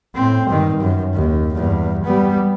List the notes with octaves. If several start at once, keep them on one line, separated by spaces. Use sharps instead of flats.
A2 C4
G2 D#3
F#2
D#2
E2 G2
G3 B3